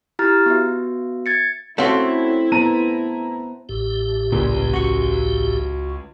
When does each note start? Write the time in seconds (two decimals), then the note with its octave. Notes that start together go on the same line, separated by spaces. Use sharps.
0.19 E4 F4 G4 A#5 F6 A6
0.46 B3 F#4 E5
1.26 G#6 A6 C#7
1.78 A3 C4 C#4 E4 F#4 A4
2.52 B3 C5 A5 A#5 D#7
3.69 A1 A2 G4
4.32 C#2 A#2
4.74 F#4 C#6